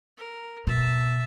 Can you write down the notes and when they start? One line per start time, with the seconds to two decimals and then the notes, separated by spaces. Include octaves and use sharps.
0.17 A#4
0.67 B2 E5 A5